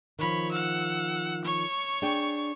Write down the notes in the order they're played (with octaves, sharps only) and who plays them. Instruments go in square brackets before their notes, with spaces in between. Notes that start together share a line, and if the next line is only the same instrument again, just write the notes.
[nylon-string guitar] D#3 F3 [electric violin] C#5 B5
[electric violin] F#5 E6
C#5 C#6
[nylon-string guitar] D4 G#4 G5